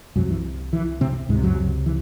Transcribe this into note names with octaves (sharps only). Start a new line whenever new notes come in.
C2 F#2 C3 F#3
E3
E3
C3 C4
C#2 G#2 C3 G#3
F#2 F#3
E3